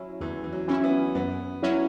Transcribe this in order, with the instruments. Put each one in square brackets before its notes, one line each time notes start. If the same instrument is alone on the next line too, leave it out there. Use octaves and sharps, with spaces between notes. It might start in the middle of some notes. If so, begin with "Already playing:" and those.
Already playing: [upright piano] F#3 [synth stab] C#4 E4
[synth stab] E2 [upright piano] E3
[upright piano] E3
F#3
[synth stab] E3 C#4 E4
[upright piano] B3
[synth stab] F#2 [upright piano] B3
[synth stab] F#3 C#4 E4